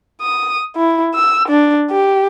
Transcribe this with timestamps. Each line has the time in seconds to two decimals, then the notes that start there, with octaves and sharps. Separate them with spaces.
0.22 D#6
0.76 E4
1.14 E6
1.48 D4
1.91 G4